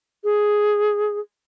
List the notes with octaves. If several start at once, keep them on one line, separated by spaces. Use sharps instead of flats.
G#4